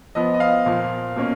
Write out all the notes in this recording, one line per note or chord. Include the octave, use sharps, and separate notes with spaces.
F3 B3 D#5
D#5
F5
A#2 F3 A#3
B2 A#3 C#4